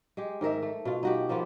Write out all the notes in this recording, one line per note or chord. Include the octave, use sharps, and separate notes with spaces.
G#3 G4
G#2 D#3 A#4 E5
A3
B2 F4
D#4 F#4 G4
F3 A#3 B3 F4